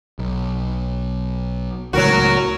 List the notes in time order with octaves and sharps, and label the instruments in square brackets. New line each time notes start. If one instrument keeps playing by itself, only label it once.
[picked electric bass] B1
[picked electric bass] C#2 A2 [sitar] F#3 F#4 [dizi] A#4